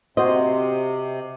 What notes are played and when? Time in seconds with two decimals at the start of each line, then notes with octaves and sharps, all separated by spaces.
0.17 C3 F#4 C5 D#5